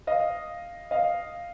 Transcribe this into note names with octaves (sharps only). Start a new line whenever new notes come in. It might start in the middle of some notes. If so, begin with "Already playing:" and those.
D#5 F5
D#5 F5